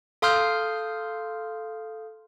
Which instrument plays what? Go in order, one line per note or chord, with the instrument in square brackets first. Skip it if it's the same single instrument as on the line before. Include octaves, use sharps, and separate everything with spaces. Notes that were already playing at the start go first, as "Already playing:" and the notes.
[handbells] A4 F5 C6 D#6 F6 G6